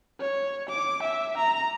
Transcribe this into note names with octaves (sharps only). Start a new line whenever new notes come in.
C#5
D6
E5
A#5